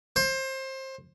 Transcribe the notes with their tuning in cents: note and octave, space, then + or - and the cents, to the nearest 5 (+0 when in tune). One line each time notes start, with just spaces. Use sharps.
C5 +25